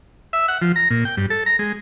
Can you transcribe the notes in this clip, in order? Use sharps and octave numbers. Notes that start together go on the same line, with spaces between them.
E5
F#5
F3
A#5
A#2
G5
G2
A4
A#5
G#3